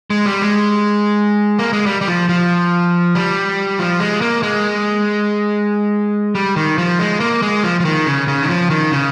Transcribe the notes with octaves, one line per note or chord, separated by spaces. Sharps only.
G#3
G3
G#3
A#3
G#3
G3
G3
F3
F3
G3
F3
G#3
A#3
G#3
G3
D#3
F3
G#3
A#3
G#3
F3
F3
D#3
C#3
C#3
D#3
F3
D#3
C#3